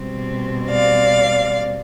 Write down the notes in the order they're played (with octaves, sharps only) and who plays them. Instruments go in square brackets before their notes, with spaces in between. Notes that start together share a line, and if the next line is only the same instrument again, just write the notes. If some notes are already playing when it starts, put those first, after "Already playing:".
Already playing: [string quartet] B2 G3 C4
D5 F5